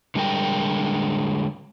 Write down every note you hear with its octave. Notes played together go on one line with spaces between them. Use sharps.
D3 G3 G#3 A#4 G5